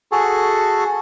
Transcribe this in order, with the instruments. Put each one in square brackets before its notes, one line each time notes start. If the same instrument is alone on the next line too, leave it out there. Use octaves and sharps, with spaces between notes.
[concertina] F#4 G#4 A4